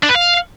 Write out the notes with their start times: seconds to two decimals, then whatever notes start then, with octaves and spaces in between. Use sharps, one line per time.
0.03 D4
0.09 B4
0.15 F5